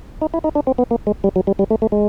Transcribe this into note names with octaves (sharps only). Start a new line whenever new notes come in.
D#4
E4
D#4
D4
C4
B3
A#3
G#3
G3
F#3
G3
G3
A3
A3
G#3